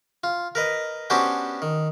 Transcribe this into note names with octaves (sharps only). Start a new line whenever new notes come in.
F4
A#4 B4 D#5
B3 C#4 D4 F#4 G4 C5
D#3